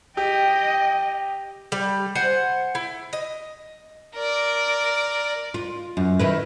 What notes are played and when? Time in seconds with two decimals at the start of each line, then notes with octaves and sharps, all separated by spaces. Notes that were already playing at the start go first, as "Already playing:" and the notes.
0.17 G4 D#5 G5
1.72 G3
2.15 C5 F#5 G#5
2.75 E4
3.13 D#5
4.14 A#4 D5
5.54 F4
5.97 F#2
6.19 D#3 E4 B4